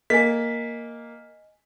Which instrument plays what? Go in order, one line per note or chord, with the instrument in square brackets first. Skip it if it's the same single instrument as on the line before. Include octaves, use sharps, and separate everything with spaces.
[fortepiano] A#3 [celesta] D#5 G#5 [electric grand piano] B6